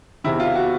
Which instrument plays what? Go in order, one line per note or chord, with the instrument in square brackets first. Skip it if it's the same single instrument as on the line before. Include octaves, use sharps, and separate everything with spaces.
[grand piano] E2 C3 D#3 E4
F4
F#4